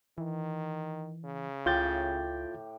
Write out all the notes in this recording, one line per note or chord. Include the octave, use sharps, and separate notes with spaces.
D#3 E3
C#3
C#2 A2 F4 G4 G5 G6 A6